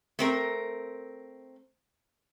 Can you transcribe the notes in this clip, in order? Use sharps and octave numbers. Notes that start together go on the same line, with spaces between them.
A3 C4 A#4